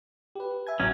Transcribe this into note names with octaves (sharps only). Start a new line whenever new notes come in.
G4 B4
E5 G#5 G#6
A1 F#3 C#4